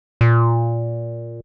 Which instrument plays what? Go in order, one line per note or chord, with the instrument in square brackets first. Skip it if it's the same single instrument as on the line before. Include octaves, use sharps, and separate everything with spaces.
[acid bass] A#2